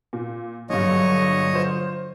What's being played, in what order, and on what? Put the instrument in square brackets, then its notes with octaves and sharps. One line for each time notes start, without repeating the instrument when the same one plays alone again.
[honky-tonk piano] A#2
[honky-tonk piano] A#1 G2 [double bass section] D3 F#3 [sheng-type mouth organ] C#5 D#5
[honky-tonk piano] F4 C5